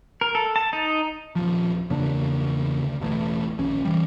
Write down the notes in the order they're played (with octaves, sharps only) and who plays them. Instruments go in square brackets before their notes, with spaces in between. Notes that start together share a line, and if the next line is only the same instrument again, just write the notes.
[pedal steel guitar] A#4
A4
A5
D#4
[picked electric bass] D#1 F3
E2 C#3 A#3 D4
D2
E1 A1 A2
A#1 D#2 C#4
E3 G3